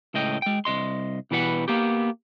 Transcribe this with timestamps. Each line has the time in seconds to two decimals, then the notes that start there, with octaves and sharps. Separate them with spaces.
0.14 C#2 A2 D#5 G5
0.42 G#3 G5
0.65 C2 D#5 C6
1.31 B2 E3 G3 B4 F#5
1.68 A#3 B3 G4